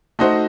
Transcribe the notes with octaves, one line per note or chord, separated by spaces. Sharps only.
A3 D#4 F#4 C5 D#5